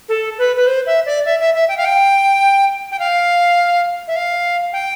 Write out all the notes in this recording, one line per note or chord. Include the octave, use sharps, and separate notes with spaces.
A4
B4
B4
C5
E5
D5
E5
E5
E5
G5
F5
G5
G5
F5
E5
F5
G5